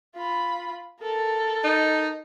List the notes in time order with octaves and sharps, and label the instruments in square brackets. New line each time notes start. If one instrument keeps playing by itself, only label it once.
[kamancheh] F4 B5
A4 A#4
[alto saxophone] D#4